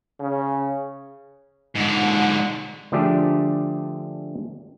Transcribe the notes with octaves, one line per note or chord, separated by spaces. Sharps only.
C#3
G#2 D3
D3 F3 A3 D4 G4 G#4